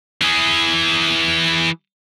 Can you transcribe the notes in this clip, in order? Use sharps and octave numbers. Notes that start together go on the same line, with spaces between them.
E3 G#4